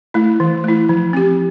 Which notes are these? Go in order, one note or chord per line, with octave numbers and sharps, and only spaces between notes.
A3 E4
E3
A3 E4
F3
C4 G4